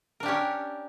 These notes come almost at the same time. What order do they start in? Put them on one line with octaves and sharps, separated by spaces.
A#4 D4 G4 C#4